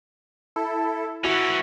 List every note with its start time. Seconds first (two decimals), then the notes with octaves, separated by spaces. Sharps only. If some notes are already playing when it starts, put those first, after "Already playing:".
0.56 E4 A4
1.24 E3 C#4 E4 F#4 E5 G#6